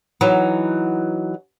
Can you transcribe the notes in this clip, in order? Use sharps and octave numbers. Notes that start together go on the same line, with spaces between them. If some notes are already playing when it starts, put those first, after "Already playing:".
E3 F#3 D#4